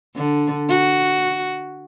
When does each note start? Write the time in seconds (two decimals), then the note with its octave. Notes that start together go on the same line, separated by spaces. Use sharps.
0.16 D3
0.69 F#4